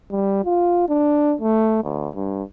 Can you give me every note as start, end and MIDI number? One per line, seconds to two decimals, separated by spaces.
0.11 0.43 55
0.45 0.85 65
0.88 1.35 62
1.41 1.80 57
1.83 2.08 38
2.15 2.43 43